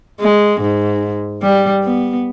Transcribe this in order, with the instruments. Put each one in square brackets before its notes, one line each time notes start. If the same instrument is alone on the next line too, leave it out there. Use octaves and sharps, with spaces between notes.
[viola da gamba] G#3
G#2
G3
B3